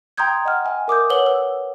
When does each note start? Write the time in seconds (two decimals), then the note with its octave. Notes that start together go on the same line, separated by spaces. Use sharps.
0.17 G5 A#5 C6 D#6 G6 G#6
0.45 D#5 F#5 F6
0.65 E5 G#5
0.88 A#4 D6 D#6 G6
1.10 B4 C#5 F#5 E6 F#7 G7
1.26 E6